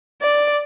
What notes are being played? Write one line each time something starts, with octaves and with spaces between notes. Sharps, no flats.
D5